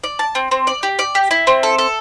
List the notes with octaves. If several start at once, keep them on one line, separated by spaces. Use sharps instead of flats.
D5
A5
C4
C4
D5
G4
D5
G4
E4
C4
A4
A4